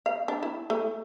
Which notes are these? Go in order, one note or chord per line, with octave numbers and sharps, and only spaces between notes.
F5
D4
E4
A3